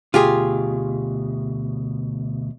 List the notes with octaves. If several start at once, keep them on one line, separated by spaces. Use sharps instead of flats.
D2 B2 F4 G4 G#4